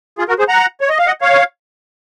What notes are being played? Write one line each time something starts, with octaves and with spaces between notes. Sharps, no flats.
F4 G#4
F#4 A#4
G#4 C5
F#5 A#5
C#5
D#5
F5
D#5 F#5
C#5 F5